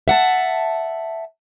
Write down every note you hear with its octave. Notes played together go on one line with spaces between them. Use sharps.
E5 F#5 A5